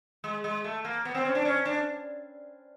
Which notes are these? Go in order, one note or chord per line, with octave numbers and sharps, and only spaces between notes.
G#3
G#3
A3
A#3
B3
C4
C#4
D4
C#4
D4